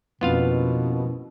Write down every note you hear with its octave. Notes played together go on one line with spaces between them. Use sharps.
F2 B2 A#3 B3 C#4 E4 F4 F5